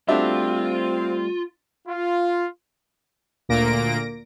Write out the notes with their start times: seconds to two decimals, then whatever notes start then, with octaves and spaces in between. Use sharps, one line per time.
0.08 G3 A3 C4 D4 F4 F#4 E5
1.87 F4
3.49 D2 A#2 A#3 A#6 D7